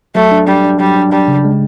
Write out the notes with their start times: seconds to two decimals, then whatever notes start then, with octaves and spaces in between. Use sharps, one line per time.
0.15 F#3 A3
0.32 D4
0.47 G3 D4
0.64 D4
0.80 F#3 G3
0.96 D4
1.12 G3 D4
1.28 C#3
1.45 G#3